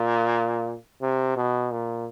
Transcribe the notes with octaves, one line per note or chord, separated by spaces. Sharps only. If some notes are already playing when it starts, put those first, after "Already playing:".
Already playing: A#2
C3
B2
A#2